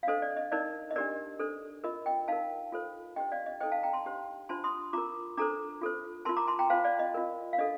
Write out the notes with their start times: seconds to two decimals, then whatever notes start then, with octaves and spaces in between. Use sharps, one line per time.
0.03 F5
0.07 D4 A4 C5 D#5
0.22 D5
0.37 D#5
0.52 D#4 A#4 D5
0.91 D#5
0.96 D4 G4 A#4 D5
1.39 D4 A4 C5
1.84 F4 A#4 D#5
2.06 D#5 G5
2.28 D#4 A#4 F5 A5
2.72 F4 A4 C5
3.16 D4 G4 C5 D#5 G5
3.32 D5 F5
3.46 D#5
3.60 D#4 A4 C5 D#5 G5
3.72 F5 A5
3.83 G5 A#5
3.93 A5 C6
4.05 D4 G4 C5
4.49 D4 F4 C5 A5 C6
4.64 C6 D#6
4.93 F4 A#4 A#5 D6
5.37 D4 A4 C5 A#5 D6
5.81 F4 A4 C5
6.25 F4 A#4 A5 C6
6.36 A#5 D6
6.47 A5 C6
6.59 G5 A#5
6.70 F4 C5 F5 A5
6.84 D5 F5
6.99 D#5
7.14 F4 A#4
7.53 F5
7.58 D4 A4 D#5